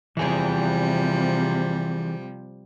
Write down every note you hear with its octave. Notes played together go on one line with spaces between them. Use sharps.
C3 E3 F3 G3 G#4